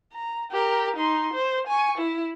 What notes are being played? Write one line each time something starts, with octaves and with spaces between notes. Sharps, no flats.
A#5
G4 A#4
D#4 C6
C5
G#5 C#6
E4